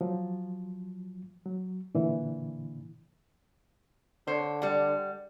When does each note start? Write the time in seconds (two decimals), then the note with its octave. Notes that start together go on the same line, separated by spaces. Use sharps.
0.01 F3 F#3
1.45 F#3
1.95 A#2 D3 E3
4.27 D3 C5 C#5
4.62 G3 F#5